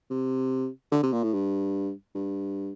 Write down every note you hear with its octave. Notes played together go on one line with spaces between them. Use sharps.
C3
D3
C3
A#2
A2
G2
G2